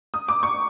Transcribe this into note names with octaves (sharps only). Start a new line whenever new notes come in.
D#6
D6
C#6